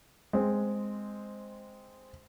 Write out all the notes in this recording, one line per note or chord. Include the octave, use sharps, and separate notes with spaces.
G#3 C4